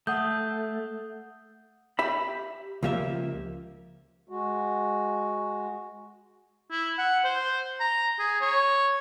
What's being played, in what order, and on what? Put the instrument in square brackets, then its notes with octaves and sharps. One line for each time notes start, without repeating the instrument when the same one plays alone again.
[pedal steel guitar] A3 [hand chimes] F#5 D#6 G6
[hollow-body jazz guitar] G4 E5 B5
C#2 F3 A#3 G4 E5
[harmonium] G#3 F#4
[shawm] E4
F#5
C5
A#5
G#4
C#5